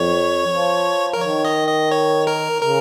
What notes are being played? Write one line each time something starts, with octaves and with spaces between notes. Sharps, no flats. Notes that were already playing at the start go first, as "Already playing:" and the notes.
Already playing: F2 C#5
F3
A#4
D#3 C#5
D#5
D#5
C#5
A#4
C#3 A#4